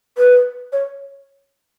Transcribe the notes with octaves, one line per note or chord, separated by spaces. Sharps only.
B4
C#5